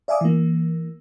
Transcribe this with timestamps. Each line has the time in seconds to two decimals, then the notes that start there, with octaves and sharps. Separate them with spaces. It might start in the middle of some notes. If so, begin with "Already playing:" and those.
0.08 D5 E5 F5 G#5 D6 D#6
0.21 E3 A#3